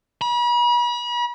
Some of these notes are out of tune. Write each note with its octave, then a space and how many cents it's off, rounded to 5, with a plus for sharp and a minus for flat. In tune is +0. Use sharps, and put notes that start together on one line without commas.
B5 -40